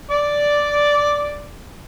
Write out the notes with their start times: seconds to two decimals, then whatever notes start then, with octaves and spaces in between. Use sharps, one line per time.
0.11 D5 D6